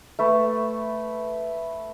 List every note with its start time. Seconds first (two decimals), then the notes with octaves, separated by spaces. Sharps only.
0.19 A3 B4